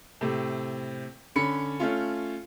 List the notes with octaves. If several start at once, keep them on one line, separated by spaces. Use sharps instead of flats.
A2 C3
D3 C#4 B5 C#7
A3 C#4 F4